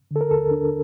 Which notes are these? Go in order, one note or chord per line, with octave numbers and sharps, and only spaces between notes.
D3 A4
A#4
D#2 A4
D4